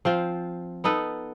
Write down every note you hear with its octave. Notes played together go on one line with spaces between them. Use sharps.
F3 C4 F4
B3 D#4 A4 B4